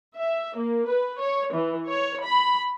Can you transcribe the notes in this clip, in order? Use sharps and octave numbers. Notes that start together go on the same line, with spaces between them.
E5
A#3
B4
C#5
E3
C#5
B5